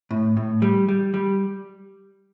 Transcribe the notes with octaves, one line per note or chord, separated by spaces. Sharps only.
A2
A2
G3
G3
G3